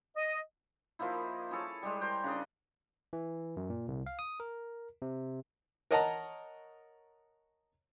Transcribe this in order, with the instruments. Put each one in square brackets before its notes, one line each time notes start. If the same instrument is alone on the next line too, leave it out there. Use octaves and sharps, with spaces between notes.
[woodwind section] D#5
[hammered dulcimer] F3 A#3 D#4 E4
E4 G#4 A4 C#5
G3 G#3
A#4 C5 G5
C#3 D4 D#5
[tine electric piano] E3
F#2
A#2
C2
F5
D#6
A#4
C3
[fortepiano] A#4 C#5 D#5 F#5 A5 A#5